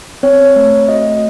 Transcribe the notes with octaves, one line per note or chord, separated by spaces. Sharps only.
C4 C#5
A3
F#4 D#5